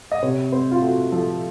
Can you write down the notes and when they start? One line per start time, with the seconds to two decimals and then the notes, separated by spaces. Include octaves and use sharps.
0.12 D#5
0.23 C3 C#5
0.52 C4 C5
0.72 F4
0.82 A3 F#4
1.12 F3 A4